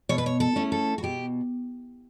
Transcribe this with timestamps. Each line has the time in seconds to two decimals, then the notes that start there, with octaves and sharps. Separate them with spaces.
0.09 B2 C#5
0.18 B4
0.26 C#5
0.40 A4
0.56 A3 C#4 E4
0.72 A4
0.98 F#4
1.03 B2 G4